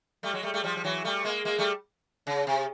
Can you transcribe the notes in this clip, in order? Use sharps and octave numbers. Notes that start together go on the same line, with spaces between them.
G3 A3
F#3 G#3
G3 A3
G3 A3
F3 G3
F3
E3 F#3
G3 A3
G#3 A#3
G#3 A#3
G3 A3
C#3
C3